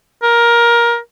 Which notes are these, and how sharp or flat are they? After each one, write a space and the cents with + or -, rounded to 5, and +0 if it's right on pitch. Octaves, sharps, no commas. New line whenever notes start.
A#4 +15